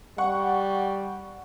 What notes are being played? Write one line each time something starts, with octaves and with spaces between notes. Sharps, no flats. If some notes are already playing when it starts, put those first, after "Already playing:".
G3 F#5 C#6